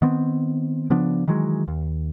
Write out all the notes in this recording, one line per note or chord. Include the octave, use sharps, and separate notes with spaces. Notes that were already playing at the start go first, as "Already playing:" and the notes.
D#3 B3 C4
C#3 F3 B3 D4
D#3 E3 F#3 G#3
D#2